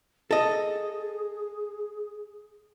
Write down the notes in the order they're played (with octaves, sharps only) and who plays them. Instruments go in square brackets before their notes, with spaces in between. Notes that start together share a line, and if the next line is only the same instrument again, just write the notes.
[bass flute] G#4 [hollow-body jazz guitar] A4 D#5